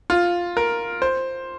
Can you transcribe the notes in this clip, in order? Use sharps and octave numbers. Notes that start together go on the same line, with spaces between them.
F4
A#4
C5